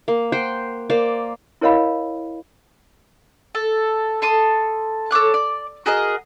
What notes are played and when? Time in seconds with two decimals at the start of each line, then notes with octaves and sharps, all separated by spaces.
0.08 A#3
0.32 C5 F#5 G5 C6
0.90 A#3 C5 D5
1.61 E4 A#4 C#5 D#5 F5 B5
3.55 A4
4.22 A4 A5 C6 D#6
5.11 A4 C#5 D6 F#6
5.34 D5
5.86 F#4 G#4 A#4 D#5